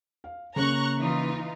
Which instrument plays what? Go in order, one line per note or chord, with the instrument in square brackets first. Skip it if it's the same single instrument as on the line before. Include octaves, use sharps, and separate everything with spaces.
[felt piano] F5
[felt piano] C#3 A#3 C#4 [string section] A#5 C#6 F#6
[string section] E3 D#4 F4